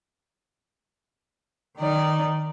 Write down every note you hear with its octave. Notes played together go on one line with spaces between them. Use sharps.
D#3 D#4 D5